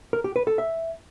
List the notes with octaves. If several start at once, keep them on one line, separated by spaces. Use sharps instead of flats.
A#4
G4
B4
A4
E5